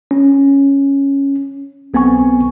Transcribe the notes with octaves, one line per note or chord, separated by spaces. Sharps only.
C#4
B1 B3 C4 G#5 C#6